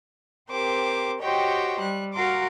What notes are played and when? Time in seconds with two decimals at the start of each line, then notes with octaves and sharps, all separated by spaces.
0.51 C4 G4 A#4 C5 D6
1.23 F#4 G4 C5 C#5 D#5 G5
1.81 G3 F#6
2.14 F#4 A#4 F5 A#5 C6 D6